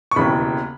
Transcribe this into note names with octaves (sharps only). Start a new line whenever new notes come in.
C#6
E1 D#2 C#3 E3 B5